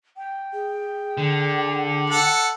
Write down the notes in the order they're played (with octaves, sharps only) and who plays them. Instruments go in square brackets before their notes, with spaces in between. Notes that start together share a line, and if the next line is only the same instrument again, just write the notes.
[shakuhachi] G5
[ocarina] G#4
[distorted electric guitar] D3
[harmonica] A4 F#5